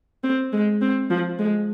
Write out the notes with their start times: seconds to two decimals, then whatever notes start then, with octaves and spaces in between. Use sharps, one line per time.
0.24 C4
0.52 G#3
0.81 C4
1.10 F3
1.39 G#3